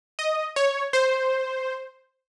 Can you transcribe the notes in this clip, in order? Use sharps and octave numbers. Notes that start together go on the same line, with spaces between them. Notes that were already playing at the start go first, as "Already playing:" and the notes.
D#5
C#5
C5